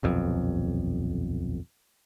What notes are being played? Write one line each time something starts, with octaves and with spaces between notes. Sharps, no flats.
D#1 B1 F2